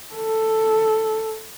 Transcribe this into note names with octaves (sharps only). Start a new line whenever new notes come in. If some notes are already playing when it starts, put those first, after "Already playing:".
A4